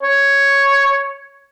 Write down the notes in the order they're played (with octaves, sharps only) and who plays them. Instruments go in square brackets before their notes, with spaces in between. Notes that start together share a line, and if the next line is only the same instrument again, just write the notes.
[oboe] C#5